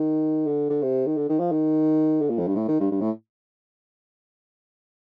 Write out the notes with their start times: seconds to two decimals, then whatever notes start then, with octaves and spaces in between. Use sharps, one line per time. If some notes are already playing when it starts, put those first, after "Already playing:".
Already playing: D#3
0.47 D3
0.70 D3
0.82 C3
1.06 D#3
1.17 D3
1.29 D#3
1.39 F3
1.51 D#3
2.21 D3
2.29 A#2
2.39 F2
2.47 G2
2.56 A2
2.68 D#3
2.80 G2
2.91 G2
3.01 A2